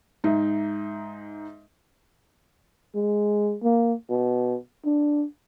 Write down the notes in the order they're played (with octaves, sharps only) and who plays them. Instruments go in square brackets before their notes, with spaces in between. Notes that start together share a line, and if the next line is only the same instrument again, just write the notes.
[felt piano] G#2 D#4 E5
[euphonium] G#3
A#3
B2
D4